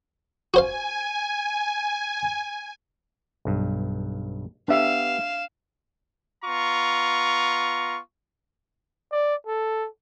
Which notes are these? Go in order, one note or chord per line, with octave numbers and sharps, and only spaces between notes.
F#4 C5 F5 G#5
B1 G2
B3 D4 G4 E5 F5 E7
B3 F4 A#5 C#6
D5
A4